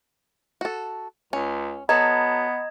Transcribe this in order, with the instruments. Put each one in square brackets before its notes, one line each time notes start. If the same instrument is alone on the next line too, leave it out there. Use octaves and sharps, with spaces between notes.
[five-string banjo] F#4 A4
[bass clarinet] C#2 [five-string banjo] C#4
[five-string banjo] F#3 A4 B4 [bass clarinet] B3 [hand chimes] D#5 A#5 G#6